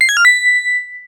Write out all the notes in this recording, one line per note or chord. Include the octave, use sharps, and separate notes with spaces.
C7
G#6
F6
B6